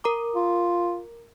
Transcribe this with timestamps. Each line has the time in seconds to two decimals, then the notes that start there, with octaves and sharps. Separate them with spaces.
0.04 A#4 A#5 D6
0.36 F4